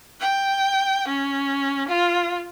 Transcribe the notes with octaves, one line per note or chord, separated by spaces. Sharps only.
G5
C#4
F4